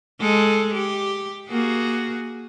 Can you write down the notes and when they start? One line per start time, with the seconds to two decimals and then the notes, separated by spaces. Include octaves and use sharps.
0.21 G#3 A4
0.74 G4
1.49 A#3 F#4 G#4